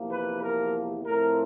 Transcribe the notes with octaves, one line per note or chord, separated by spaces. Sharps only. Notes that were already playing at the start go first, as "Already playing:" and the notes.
Already playing: E2 C3 F3 A#3
B4
A#4
A2 F3 A3 C4 A#4